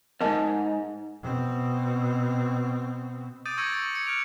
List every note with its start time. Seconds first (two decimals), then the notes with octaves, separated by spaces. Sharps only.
0.21 E2 G#2 A#4 D#5 A5
1.22 B2 C4
3.45 D6 D#6 G6 A6 D7 D#7
3.58 C#6 E6 G#6 A#6 C#7 D#7
3.72 A6 C#7
3.95 G#6 C#7
4.07 F6 F#6 D7 F7